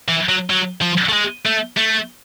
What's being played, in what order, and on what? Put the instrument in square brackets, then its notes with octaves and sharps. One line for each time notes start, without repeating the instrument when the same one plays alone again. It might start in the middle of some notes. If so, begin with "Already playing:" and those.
[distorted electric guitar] E3
F#3
F#3
F3
A3
G#3
A3
A3